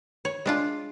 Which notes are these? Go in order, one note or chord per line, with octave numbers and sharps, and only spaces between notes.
C#5
G#3 D4 F4